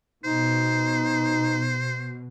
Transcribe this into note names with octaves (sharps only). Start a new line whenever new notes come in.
B2 D#4 C5